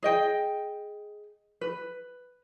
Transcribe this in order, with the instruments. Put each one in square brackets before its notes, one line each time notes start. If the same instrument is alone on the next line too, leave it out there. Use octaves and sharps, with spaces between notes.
[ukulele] G#4 D#5 G5
B4